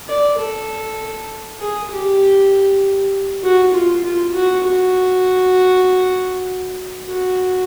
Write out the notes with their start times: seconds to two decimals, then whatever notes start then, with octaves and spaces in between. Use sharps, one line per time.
0.09 D5
0.39 A4
1.60 G#4
1.91 G4
3.43 F#4
3.73 F4
4.04 F4
4.34 F#4
4.64 F#4
7.08 F#4